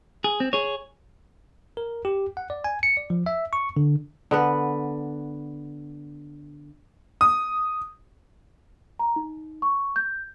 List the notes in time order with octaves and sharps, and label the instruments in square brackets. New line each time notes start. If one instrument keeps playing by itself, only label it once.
[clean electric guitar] G#4
C4
G#4 C#5
[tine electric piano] A#4
G4
F#5
D5
G#5
C#7
D5
F3
E5
C#6
D3
[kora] D3 B3 B4
[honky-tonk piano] D#6
[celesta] A#5
D#4
C#6
G6